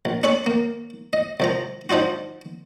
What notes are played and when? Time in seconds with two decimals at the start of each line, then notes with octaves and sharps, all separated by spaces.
0.05 A#1
0.23 D4 A4 C#5 G#5 B5
0.46 A#3
1.13 D#5
1.40 C2 F3 A#5
1.89 F3 D4 D#4 F4 F#4